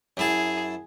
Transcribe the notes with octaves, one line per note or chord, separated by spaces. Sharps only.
F#2 E4 G#4 A5